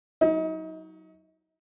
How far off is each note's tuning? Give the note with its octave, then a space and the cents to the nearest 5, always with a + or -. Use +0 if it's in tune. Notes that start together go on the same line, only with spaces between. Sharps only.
F#3 +5 D#4 +35